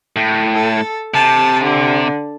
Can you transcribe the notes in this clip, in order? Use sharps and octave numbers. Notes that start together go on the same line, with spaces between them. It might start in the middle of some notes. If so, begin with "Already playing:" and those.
A2
A4
C3 A5
D3